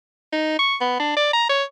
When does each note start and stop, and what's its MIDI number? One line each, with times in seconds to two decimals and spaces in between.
0.33 0.57 63
0.59 0.76 85
0.81 0.99 59
0.99 1.15 62
1.16 1.31 74
1.33 1.48 82
1.49 1.64 73